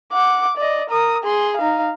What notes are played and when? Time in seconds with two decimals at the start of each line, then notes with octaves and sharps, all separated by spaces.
0.13 F#5 D6
0.57 D5 D#5
0.89 A#4 D#6
1.23 G#4 C6
1.57 D#4 F5